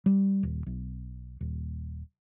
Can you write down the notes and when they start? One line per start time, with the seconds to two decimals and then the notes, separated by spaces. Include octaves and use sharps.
0.06 G3
0.43 D#1
0.66 B1
1.41 D#1